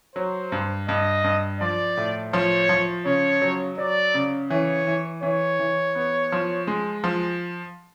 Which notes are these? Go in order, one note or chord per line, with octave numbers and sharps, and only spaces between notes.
F#3 C5
G2
G2 D#5
G2
F3 D5
A2
F3 C#5
F3
C#3 C#5
F#3
F#3 D5
C#3
E3 C#5
E3
E3 C#5
E3
B3
F3
G#3
F3